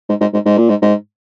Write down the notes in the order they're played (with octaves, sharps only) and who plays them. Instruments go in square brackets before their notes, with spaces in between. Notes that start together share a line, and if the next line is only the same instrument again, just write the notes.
[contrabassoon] G#2
G#2
G#2
G#2
A#2
G#2
G#2